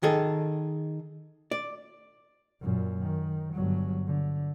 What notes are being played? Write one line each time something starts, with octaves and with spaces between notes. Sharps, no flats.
D#3 G#4 A4
D5
F#2 A#2
D#3
G1 F#3
D3